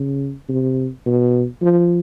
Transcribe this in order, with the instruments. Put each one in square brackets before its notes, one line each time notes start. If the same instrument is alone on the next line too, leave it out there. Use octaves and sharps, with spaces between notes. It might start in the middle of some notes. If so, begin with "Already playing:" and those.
Already playing: [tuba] C#3
C3
B2
F3